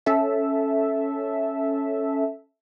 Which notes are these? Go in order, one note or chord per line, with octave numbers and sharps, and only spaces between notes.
C#4 A4 E5